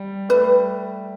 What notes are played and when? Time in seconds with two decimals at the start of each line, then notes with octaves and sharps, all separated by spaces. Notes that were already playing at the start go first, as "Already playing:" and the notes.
Already playing: G3
0.29 G3 A3 B4